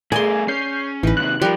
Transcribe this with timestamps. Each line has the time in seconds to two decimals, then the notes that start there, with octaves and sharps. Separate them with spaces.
0.12 A3 G#4 A#4 D5 G#5 C6
0.48 C#4 G6 C7
1.03 A1 E3 D#4 B4
1.17 D#2 C3 F#6
1.42 F3 G3 A#4